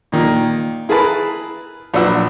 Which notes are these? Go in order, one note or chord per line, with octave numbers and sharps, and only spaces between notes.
A#2 D#3 A#3
E4 G#4 A#4 B4 A5 B5
A#1 F#3 D4 B4 F#5 E6